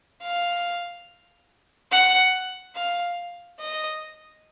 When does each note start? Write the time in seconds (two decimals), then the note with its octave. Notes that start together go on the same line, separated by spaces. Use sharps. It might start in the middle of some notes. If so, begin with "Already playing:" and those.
0.22 F5
1.91 F#5
2.75 F5
3.61 D#5